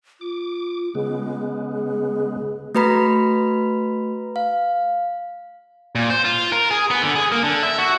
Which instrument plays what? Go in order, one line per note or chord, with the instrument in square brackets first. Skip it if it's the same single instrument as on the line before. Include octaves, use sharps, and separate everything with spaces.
[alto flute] F4 [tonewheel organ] D6
[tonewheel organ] C#3 G#3 B3 [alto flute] G#4
[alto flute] G#4
[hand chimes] A3 F#4 B4 A#5 B5 B6
F5
[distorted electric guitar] A#2
C5
F4
A#4
G#4
B3
D3
G#4
A#3
D3
E5
F#4